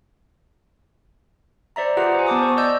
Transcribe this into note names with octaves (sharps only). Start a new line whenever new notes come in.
C5 D5 E5 A#5
F4 G4 G#4 B4 F#5 A#5
C5 G#5
B3 A5 D6 D#6
C5 C#6
D5 D#5 E6 G6